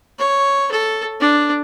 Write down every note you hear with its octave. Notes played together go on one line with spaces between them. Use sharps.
C#5
A4
D4